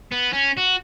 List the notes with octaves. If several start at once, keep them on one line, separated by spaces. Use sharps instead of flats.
B3
C#4
F#4